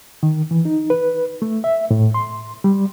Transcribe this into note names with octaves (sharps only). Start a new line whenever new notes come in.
D#3
E3
D#4
B4
A3
E5
A2
C6
G3